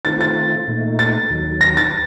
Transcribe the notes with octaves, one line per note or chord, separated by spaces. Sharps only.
D#3 A3 C4 F4 A6
A6
A#2 A3 D#4
A6
D#2 D#3 F#3
A#6
A6